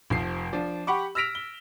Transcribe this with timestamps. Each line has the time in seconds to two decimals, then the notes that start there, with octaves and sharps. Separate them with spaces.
0.10 F1 F3 C7
0.52 F3 D4
0.87 G4 F#5 B5 C#6 D6
1.15 E6 F6 A#6 B6 D7 F7
1.35 G7